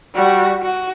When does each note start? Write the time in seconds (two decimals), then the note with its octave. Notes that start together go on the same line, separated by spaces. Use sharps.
0.15 G3 F#4
0.63 F#4